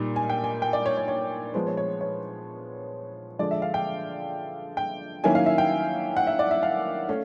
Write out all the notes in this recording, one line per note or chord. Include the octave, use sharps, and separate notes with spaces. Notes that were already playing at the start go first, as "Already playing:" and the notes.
Already playing: A#2 G3 A#3 D#4
G#5
G5
G#5
G5
D5
C#5
C#5
C#5
F3 G#3 B3 C5
C#5
C#5
C#5
D3 F3 G#3 D5
E5
F5
G5
G5
D#3 F#3 A#3 C#4 E4 G#5
F5
E5
G5
F#5
E5
D5
E5
F5
A3 C#4